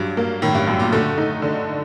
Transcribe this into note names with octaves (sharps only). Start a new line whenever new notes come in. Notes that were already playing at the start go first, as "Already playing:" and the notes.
Already playing: G2 F#3
A#3
A2 D#3
G2
F#2 A2
A#2
D3 A3
D#4
D3